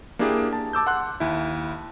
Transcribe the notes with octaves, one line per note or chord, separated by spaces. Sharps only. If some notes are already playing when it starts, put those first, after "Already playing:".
A#3 D4 E4 G4 G#4
A5
A5 D6 E6 G6
F#5 C6 F#6
D#2 E4